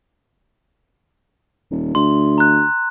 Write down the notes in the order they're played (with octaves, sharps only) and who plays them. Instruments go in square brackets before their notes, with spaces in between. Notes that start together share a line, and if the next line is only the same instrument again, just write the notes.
[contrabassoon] D#1
[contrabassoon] D2 [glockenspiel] C6
[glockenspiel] A#5 F#6